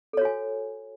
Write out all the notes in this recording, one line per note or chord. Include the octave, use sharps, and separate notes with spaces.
F#4 A4 C#5 G#5